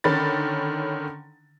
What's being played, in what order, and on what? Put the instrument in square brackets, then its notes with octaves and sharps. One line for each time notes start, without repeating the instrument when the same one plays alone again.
[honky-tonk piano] D3 D#3 C#4 B5 A6